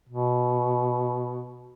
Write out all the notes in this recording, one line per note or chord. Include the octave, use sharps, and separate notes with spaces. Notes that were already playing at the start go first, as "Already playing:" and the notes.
B2